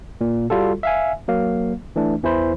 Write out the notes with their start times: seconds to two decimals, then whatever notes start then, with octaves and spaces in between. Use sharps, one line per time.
0.21 A#2
0.50 G3 F4 F#4 A4
0.83 E5 F5 G#5
1.28 F#3 A#3 F5
1.96 E3 A3 D4
2.23 E2 E3 E4 C5 B5